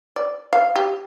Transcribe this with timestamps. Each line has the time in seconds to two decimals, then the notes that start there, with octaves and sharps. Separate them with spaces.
0.16 D5
0.53 F5
0.76 G4